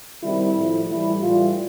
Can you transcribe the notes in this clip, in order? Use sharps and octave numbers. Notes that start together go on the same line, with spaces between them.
C3 D#3 G3 E4
A2 F3
A2 E3 G3 E4
A2 E3 G3 F4